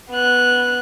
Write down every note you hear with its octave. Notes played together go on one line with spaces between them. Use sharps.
B3 F#6